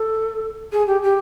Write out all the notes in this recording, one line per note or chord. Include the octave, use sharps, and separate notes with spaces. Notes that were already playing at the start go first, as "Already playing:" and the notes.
Already playing: A4
G#4
G4
G4